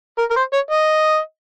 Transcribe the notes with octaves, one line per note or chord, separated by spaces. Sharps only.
A#4
A#4
C5
C#5
D#5